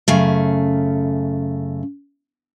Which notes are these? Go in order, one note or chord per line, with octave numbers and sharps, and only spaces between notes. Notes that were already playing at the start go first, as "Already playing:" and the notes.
F#2 C#3 A3